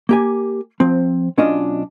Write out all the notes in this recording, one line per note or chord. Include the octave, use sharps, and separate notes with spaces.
A#3 G4 G#5
F3 C4
B1 C#4 D4 F4 D#5